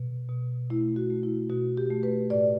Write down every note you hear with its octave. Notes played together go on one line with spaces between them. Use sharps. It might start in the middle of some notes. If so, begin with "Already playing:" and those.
Already playing: B2
B2
A3 E4
F#4
A3
E4
B2 F#4
G4
A3
B4
A2 D5